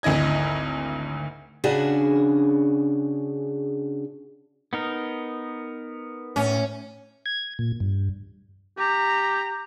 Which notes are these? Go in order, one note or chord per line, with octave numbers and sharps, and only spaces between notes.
G#1 D2 E4 D#5 G#6
C#3 D4 F#4 G#4
B3 D#4 A#4
A2 C#4
G#6
A#2
G2
G4 A#5